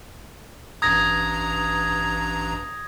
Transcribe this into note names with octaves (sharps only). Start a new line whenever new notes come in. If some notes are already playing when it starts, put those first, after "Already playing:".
A1 G2 A#5 D#6 G#6 A#6